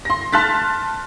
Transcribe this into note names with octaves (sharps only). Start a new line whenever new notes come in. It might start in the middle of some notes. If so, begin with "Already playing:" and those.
C6 A#6
A5 C6 F6 F#6 A6 B6